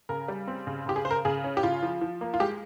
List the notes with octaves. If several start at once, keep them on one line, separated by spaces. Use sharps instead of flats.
C#3 A#4
G3
C4
C#3
C#3 G4
G#4
C#3 C5
A#4
C#3 G#4
C#4
G4
C#3 F4
F3
F3
A#3
F4
G#3 G4